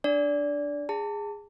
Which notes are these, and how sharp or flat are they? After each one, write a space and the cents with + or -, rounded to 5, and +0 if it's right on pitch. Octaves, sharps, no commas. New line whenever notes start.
D4 +0 D5 -20
G#4 -15 A5 +30